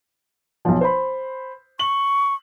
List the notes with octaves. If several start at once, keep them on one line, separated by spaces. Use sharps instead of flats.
B1 F3
C5 B5
C#6 F#7